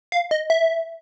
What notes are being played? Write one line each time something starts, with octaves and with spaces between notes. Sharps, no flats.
F5
D#5
E5